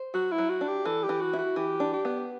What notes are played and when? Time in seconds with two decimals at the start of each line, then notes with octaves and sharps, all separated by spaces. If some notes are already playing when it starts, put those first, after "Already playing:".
Already playing: C5
0.14 F#3 F#4
0.31 E4
0.38 F#3
0.49 F#4
0.61 D4
0.68 G4
0.85 E3 A4
1.03 G4
1.09 E3
1.21 F#4
1.33 E4 F#4
1.56 E3 G4
1.80 D4
1.93 G4
2.05 B3